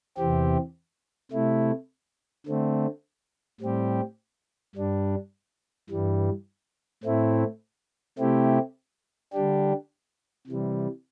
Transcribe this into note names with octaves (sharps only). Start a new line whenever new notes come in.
E2 C3 E3 C4 G4
C3 A3 E4
D3 A3 C4
A2 G3 C4 G4
G2 G3 D4
G2 E3 G3
A2 A3 C4 E4
C3 A3 C4 E4 G4
D3 G3 D4 G4
C3 E3 G3